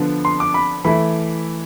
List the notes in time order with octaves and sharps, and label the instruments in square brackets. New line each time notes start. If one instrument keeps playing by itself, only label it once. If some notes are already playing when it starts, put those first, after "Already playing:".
Already playing: [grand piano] D3 F3 B3 D4
C6
D6
B5
E3 A3 E4 B5